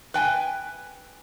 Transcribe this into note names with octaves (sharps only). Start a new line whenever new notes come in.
B4 G5 G#5